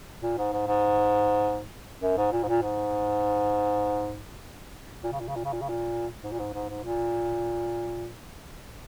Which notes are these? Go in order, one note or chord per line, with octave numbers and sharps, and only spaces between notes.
A#2
G#2
G#2
G#2
F#2
G#2
A#2
G#2
A#2
G#2
A#2
C#3
A#2
C#3
A#2
C#3
A#2
C#3
A#2
G#2
A#2
G#2
G#2
G#2
A#2